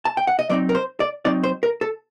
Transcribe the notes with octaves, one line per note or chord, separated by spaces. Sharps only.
A5
G5
F#5
D#5
F#3 C4 D#4 D5
A#4
C5
D5
F#3 C4 D#4 D5
C5
A#4
A4